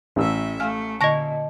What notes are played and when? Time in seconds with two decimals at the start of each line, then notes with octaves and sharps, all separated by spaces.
0.16 A1 A2 E5 E6
0.60 A3 F5 G#5 F6
1.01 A#2 D3 D#5 A5 C#6 A#6